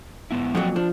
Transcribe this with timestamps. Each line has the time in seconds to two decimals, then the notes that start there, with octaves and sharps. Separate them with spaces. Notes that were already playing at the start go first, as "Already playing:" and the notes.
0.31 G#2 B3 E4
0.55 F2 A#2 F#3 A#3 F#5 G5
0.76 F3 D4